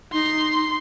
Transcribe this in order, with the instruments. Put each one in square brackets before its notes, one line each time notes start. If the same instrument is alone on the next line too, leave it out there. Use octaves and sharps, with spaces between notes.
[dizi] D#4 [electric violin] C6